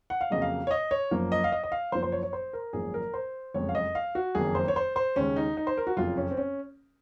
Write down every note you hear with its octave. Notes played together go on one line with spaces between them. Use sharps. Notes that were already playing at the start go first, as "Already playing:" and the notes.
F#5
F5
F2 C#3 F#3 A#3 D#5
F5
C#5
D#5
C#5
F#1 F#2 F3 A#3
D#5
F5
D#5
D#5
F5
F#1 F#2 F3 A#3 C5
C5
C#5
C#5
C5
A#4
G#1 F#2 F3 A#3 G#4
A#4
C5
F#1 F2 C#3 G#3 C#5
F5
D#5
F5
F#4
F#1 F2 D#3 A#3 G#4
C5
C#5
C5
C5
D#2 C#3 G#3 C#4
D#4
D#4
C5
A#4
F#4
F#1 F2 C#3 F4
C#4
C4
C#4